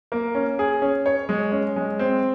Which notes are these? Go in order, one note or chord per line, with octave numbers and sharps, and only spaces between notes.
A#3
C#4
G#4
C#4
C#5
G#3
C#4
G#3
C4